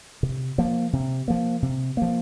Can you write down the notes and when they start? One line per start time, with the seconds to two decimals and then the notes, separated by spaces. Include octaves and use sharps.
0.23 C3
0.58 F3 A#3
0.93 C3
1.28 F3 A#3
1.62 C3
1.97 F3 A#3